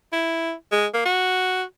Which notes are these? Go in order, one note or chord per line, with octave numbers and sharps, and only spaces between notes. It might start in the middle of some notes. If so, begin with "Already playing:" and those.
E4
G#3
A#3
F#4